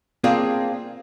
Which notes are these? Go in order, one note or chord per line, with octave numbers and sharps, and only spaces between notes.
A#3 C4 D4 F4 G#4